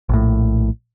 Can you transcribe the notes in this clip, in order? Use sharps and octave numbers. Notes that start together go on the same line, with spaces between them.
A#1 A2